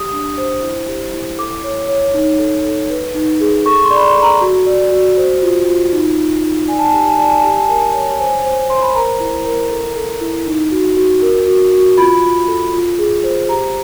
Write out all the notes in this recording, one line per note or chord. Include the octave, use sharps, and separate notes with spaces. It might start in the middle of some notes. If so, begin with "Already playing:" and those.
Already playing: G4 D#6
D4
C5
E4
G4
E4
A4 D6
C#5
C#5
D#4
A4
A4
B4
D#4
G#4
A4 C#6
C6
D5
B5
C6
A4
A#5
F#4
D5
F#4
C5
F4
F4
D#4
D#4
D#4
D5 G#5
A5
G#5
G4 A5
G#5
D5 A5
G#5
A5
G4 G#5
A5
A#4 G#5
C#5
C5 G#5
C5
C5 C6
B5
A#4 A#5
E4
A#4
A4
A4
E4
D#4
F#4
F#4
A#4
F#4
F#4
F4 B5
F4
A4
F4
G#4
C5
G4 A#5